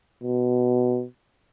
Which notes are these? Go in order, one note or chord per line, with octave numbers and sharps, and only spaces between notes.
B2